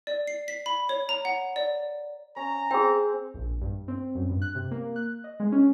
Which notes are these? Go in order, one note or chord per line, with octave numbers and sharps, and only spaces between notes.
D5
C7
B6
B5
C#5
A#5
F#5
D5
C#4 A#5
C4 G#4 G5
A#1
G2
C4
F#2
G2
F#6
C3
A#3
F#6
D#5
G#3
C#4